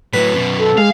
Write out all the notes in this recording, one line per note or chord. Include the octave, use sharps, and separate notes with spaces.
A2 F#3 B4
F#2 B2
A4
G#3 F5